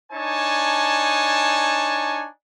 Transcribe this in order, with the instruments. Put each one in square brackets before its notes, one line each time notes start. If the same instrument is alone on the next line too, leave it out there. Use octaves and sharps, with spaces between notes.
[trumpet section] D4 D#4 C#5 G#5 A5